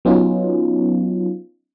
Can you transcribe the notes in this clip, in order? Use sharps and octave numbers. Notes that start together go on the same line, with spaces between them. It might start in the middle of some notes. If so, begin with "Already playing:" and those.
F#3 B3 C#4 D#4 F4